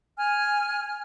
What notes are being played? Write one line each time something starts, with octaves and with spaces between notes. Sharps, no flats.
G#5 F6